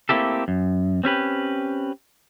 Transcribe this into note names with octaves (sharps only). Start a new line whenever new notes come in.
A3 A#3 C4 E4 G4 A4
F#2
C4 C#4 G4 B4